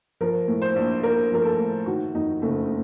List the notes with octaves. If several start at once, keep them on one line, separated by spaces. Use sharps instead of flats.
F3 A#4
A2
C5
A#1
A#1 A#4
F3 A#4
A4
A2
D#3 F#4
F2 D#4
F#1 A3